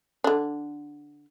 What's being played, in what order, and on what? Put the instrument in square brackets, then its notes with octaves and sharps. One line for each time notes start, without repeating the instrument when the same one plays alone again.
[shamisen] D3 D4